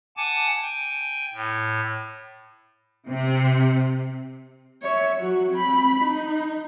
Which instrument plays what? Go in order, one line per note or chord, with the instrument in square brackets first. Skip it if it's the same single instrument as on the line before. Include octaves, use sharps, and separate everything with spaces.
[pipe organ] F#5 G#5 A5 D6
G5 G#5
A2
[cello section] C3
[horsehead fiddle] C#5 E5
F#3 F#4
C4 B5
D#4